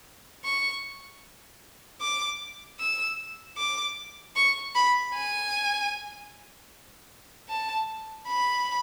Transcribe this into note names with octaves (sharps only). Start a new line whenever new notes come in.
C#6
D6
E6
D6
C#6
B5
G#5
A5
B5